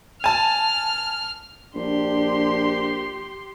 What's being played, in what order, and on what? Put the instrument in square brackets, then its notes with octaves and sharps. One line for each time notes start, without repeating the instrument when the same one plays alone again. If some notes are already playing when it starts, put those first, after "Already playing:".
[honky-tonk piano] G#5 A5 [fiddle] F6
[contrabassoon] A#1 [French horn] D4 [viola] G4 C6